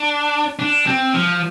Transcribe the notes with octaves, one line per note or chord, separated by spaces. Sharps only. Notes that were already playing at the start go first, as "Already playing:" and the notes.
Already playing: D4
D4
C4
F3